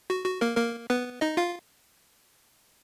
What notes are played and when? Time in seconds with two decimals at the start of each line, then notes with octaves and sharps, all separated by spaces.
0.10 F#4
0.25 F#4
0.41 A#3 A#4
0.57 A#3 A#4
0.90 B3 B4
1.21 D#4 D#5
1.37 F4 F5